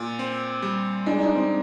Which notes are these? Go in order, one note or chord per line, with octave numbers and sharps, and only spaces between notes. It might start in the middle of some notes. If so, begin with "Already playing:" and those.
Already playing: A#2
C4
G3
G#3 D4
D#4
D4
C4